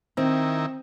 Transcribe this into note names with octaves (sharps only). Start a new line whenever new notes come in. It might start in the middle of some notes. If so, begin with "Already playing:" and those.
D#3 C4 E4 A#4